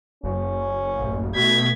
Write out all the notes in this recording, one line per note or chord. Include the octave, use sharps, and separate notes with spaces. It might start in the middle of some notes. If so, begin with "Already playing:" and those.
F#1 C#4
A1
B2 A3 G#6 B6